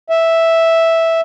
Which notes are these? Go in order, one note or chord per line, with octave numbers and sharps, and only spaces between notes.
E5